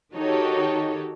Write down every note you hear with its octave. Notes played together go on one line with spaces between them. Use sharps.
D#3 D#4 F#4 G4 A4 C#5